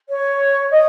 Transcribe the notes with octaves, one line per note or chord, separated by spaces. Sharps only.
C#5
D#5